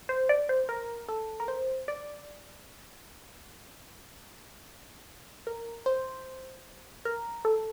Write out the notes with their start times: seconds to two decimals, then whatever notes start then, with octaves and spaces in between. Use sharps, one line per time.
0.09 C5
0.29 D5
0.49 C5
0.69 A#4
1.08 A4
1.40 A#4
1.48 C5
1.88 D5
5.47 A#4
5.86 C5
7.05 A#4
7.45 A4